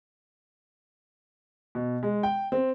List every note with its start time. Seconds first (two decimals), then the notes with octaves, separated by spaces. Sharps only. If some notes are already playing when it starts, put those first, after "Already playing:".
1.75 B2
2.03 G#3
2.23 G5
2.52 C4